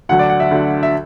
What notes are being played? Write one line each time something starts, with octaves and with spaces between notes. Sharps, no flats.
D2 D3 F#3 F#5
D5
F#5
E5
D2 D3 F#3
E5